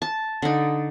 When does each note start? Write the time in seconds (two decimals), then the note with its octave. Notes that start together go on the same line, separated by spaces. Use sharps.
0.02 A5
0.42 D3 D#4